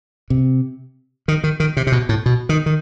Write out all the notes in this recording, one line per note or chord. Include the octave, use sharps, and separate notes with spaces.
C3
D#3
D#3
D#3
C3
C3
B2
A2
B2
D#3
D#3